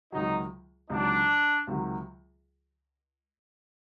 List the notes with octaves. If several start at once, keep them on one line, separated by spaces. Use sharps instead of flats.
C#2 C3 D#3 F#3 D#4
C#2 C3 D#3 F#3 D4
C#2 C3 D#3 F#3